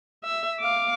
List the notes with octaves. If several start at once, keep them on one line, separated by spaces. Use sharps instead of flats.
E5
F5 D6